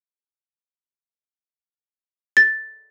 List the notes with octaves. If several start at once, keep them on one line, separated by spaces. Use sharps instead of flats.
A6